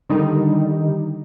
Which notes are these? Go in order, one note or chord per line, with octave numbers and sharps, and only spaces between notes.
D3 D#3 G3 D#4